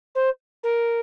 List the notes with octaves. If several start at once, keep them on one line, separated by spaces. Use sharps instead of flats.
C5
A#4